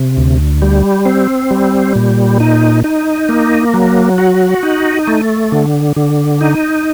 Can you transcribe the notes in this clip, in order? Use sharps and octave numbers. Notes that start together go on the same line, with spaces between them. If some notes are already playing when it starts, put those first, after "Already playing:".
Already playing: C3
D2
G3
C4
G3
A#2
D#4
D#4
A#3
F#3
F#4
D#4
A3
D3
D3
D#4